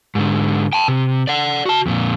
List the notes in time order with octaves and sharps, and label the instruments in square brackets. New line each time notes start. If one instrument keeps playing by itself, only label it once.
[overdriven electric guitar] G#2 D3
G5 A5
C3
D5 F#5
F#4 A5
F2 A#2